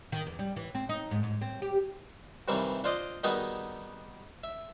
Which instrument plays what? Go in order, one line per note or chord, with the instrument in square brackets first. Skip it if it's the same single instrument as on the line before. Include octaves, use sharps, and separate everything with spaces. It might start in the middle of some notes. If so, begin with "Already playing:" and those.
[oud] D#3
E2
G3
E3
C4
D#4
G#2
G#2
C4
G4
[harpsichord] G2 C3 D#3 E3 G3
D4 F4 C5 D5 D#5 D6
D#3 G3 B3 D#4 F#4 G#4
E5